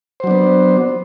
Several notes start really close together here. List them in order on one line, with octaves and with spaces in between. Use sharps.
C5 F#3 D4 B3